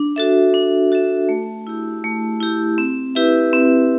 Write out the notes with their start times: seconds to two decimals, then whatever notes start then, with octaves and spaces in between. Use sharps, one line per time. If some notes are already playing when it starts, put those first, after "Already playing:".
Already playing: D4
0.16 F#4 A4 E5
0.54 D4
0.92 F#4 A4 E5
1.29 A3
1.67 E4 G4
2.04 A3
2.41 E4 G4
2.78 C4
3.15 E4 G4 B4 E5
3.53 C4